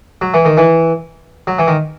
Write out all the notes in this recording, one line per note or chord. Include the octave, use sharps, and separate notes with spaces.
F#3
E3
D#3
E3
F#3
E3
D#3